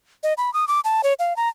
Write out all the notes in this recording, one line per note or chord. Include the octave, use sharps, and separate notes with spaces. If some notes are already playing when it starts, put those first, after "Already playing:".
D#5
B5
D#6
D6
A5
C#5
F5
A#5